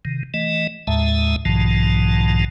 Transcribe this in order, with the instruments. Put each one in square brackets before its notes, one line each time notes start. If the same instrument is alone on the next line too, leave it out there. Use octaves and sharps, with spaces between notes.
[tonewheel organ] C3 D#3
E3 A3 D#5
D#2 A2 G#3 E5 A5
B1 G#2 B2 D#3 F3 A5